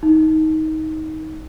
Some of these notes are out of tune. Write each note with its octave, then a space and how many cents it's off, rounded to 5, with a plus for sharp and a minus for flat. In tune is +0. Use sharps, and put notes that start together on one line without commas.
D#4 +15